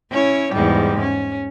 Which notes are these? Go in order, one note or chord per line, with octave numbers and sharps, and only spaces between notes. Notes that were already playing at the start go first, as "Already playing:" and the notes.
C#4 E4 C#5
E2 G#2 G3
C#4